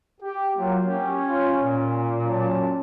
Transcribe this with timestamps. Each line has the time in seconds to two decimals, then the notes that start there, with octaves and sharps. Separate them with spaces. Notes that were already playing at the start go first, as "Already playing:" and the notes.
0.21 G4
0.57 F#3 A#3 F4
0.86 C#4 G4
1.25 F4
1.60 A#2
2.23 F#3 C#4 A5